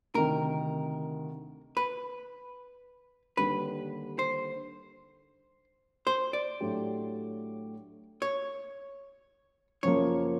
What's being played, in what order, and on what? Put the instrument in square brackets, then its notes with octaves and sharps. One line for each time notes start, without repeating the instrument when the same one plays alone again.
[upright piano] D2 C3 D#3 [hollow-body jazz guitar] A#4
[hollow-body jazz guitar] B4
[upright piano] D#2 D3 G3 [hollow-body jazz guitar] B4
[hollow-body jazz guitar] C5
C5
D5
[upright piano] A2 F#3 A3 D4 G4
[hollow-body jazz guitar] C#5
[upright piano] F#2 C#3 F3 A#3 [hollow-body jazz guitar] C#5